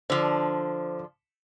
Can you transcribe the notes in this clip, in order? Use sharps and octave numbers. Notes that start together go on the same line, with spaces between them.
D3 F3 C5